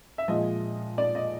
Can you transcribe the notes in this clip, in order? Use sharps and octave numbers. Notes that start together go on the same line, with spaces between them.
E5
A#2 F3 G#3 D#5
D5
D#5